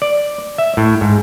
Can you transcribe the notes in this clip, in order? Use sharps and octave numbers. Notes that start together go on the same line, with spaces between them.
D5
E5
A2
G#2